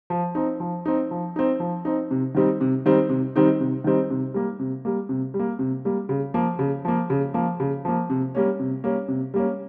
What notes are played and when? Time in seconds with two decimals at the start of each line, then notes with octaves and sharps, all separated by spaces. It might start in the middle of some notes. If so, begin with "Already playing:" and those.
0.10 F3
0.35 C4 D#4
0.60 F3
0.86 C4 D#4
1.11 F3
1.36 C4 D#4
1.60 F3
1.85 C4 D#4
2.11 C3
2.34 D#3 G3 C4 D#4
2.61 C3
2.86 D#3 G3 C4 D#4
3.09 C3
3.36 D#3 G3 C4 D#4
3.60 C3
3.84 D#3 G3 C4 D#4
4.10 C3
4.34 G3 A#3
4.59 C3
4.85 G3 A#3
5.09 C3
5.34 G3
5.39 A#3
5.59 C3
5.85 G3 A#3
6.09 C#3
6.34 F3 A#3
6.59 C#3
6.85 F3 A#3
7.10 C#3
7.34 F3 A#3
7.60 C#3
7.85 F3 A#3
8.10 C3
8.35 G3 A#3 C#4
8.60 C3
8.84 G3 A#3 C#4
9.08 C3
9.34 G3 A#3 C#4